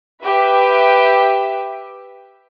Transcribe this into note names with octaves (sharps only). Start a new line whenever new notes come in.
G4 B4 E5